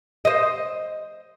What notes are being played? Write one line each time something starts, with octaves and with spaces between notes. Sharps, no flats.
C5 D#5